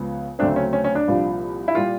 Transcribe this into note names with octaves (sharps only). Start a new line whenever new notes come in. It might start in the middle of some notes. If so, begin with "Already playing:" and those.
Already playing: C#2 C#3 F3 B3
D2 C#3 F#3 A3 C4 D4
C#4
C#4
C#4
D4
C2 A#2 F3
E4
A#2 G3 F4